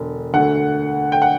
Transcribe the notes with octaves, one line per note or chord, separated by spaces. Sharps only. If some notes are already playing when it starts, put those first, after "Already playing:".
Already playing: E1 D3
D2 D3 A3 F#5
G5
F#5